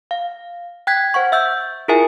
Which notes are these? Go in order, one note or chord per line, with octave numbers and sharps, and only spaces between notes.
F5
G5 F#6 G#6 B6
C5 F#5 C#6
E5 E6 G6
E4 F4 G#4 A#4 E5 G#5